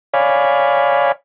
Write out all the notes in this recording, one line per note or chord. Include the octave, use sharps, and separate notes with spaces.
C#5 D5 F5 G#5 B5